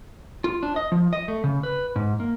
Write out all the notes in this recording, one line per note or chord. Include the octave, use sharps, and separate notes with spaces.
F4
D4
D#5
F3
D#5
A3
C#3
B4
G#2
A#3